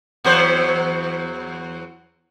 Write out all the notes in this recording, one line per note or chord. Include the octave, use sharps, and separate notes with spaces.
E2 F#3 C5